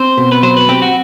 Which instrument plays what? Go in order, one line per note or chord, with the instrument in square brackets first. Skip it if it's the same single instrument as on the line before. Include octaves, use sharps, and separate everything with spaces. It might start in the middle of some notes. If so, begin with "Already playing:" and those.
Already playing: [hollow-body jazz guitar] C4 [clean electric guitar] C5
[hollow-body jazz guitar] B2
[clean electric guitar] B4
[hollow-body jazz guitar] F#3 [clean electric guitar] C5
[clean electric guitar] B4
[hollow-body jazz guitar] C4 [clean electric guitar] G4
[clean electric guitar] F#4